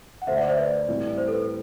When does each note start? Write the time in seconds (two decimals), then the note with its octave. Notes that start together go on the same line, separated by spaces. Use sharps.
0.22 F#5
0.27 D2 D3 A3 C5 E5
0.37 D5 F#5
0.48 C5 E5
0.58 B4 D5
0.88 A2 E3 G3 C4
1.18 C5
1.28 A4
1.33 B4